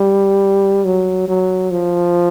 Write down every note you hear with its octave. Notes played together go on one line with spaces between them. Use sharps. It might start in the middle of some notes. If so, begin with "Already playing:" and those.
Already playing: G3
F#3
F#3
F3